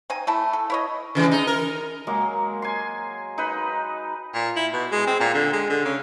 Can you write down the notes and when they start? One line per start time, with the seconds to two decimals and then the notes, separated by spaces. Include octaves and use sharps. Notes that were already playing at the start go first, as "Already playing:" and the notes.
0.10 C4 D#4 G#5
0.27 A3 E4 A5
0.53 A4
0.70 E4 C#5 D#5
1.15 C#3 E3 G#3
1.31 D#4
1.47 A#4
2.07 F#3 G#3 A#3
2.62 G#5 C6
3.38 D#4 B4
4.34 A#2
4.56 E4
4.73 B2
4.92 G#3
5.07 C4
5.20 A#2
5.35 D3
5.53 G#3
5.70 D3
5.85 C#3